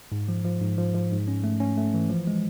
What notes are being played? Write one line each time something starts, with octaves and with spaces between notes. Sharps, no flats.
G#2
F3
F3
G#2
F3
F3
G#2
C#4
A3
C#4
A3
E3
F3
G#3